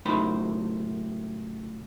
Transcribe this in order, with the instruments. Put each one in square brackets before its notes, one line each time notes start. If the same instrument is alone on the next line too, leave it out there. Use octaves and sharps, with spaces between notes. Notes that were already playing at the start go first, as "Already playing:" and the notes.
[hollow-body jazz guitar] C#2 F#2 A2 D#4 C5 B5